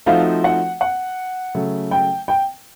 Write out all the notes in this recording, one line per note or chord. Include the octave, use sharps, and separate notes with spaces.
F3 A3 C4 D#4 F#4 F5
F#5
F#5
C#3 F#3 A3
G5
G5